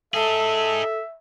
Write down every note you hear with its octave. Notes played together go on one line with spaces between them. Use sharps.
D#4 G#4 A4 E5 A5